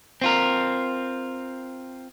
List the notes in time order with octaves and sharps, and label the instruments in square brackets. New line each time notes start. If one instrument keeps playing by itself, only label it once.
[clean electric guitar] C4 F4 A#4